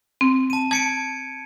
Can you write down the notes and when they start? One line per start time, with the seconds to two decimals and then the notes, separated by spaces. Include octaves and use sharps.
0.21 C4
0.50 A5 D#7
0.71 A5 G#6 C#7 D7